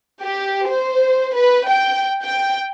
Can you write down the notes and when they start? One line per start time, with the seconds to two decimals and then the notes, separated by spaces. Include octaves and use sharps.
0.21 G4
0.68 C5
1.34 B4
1.69 G5
2.21 G5